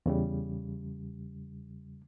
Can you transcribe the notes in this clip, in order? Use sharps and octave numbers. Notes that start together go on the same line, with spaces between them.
E2 C#3 G3